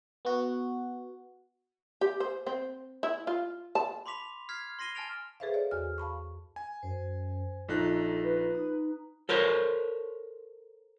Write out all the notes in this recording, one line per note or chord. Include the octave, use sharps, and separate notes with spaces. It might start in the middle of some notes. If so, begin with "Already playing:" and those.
B3 F#4
G4
C5
C4
E4
F4
A5
B5 C6 D6 B6 F7
F6 G#6 B6 C7
C6 A#6 C7 D#7 G7
G#5 A5 F6 A6 D7 F7
G#4 A4 B4 C5 E5 F5
C#5 D5 F5
E2 F#4 F6
F5 A5 B5 C#6
G#5
F#2 C5
A#1 D#4 F4 A4 F#6
B4
D#4 A#5
A4 A#4 C5 C#5